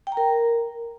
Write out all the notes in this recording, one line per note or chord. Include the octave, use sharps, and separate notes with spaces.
G5
A#5
A#4